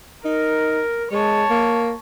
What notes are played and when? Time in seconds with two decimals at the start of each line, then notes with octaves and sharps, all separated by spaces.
0.25 D#4 A#4
1.11 G#3 C#5 A5
1.50 A#3